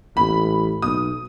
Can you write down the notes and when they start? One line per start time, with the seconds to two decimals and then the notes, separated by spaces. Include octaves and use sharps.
0.17 A1 B5
0.82 B1 D#6